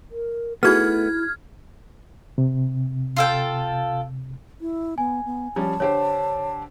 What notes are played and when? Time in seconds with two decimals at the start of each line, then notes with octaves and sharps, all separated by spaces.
0.11 A#4
0.63 A3 B3 D#4 E4 F#4 G#4 F6 G#6
2.38 C3
3.16 F4 A4 G5
4.61 E4
4.98 B3 G#5
5.26 B3
5.56 F3 G3 C#4 A5
5.80 D3 G4 C5 C#5